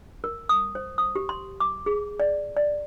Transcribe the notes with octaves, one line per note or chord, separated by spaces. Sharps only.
A#4
D#6
C5
D#6
G4
C6
D6
G#4
D5
D5